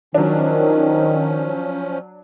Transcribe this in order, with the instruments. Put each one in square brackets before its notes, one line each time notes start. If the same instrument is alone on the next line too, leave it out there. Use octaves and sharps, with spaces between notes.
[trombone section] D#3 [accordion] F3 C#4 [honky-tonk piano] F#3 D4